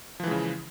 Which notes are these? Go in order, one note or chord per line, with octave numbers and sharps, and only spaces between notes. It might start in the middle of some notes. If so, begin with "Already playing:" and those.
C#3 E3 F3 G#3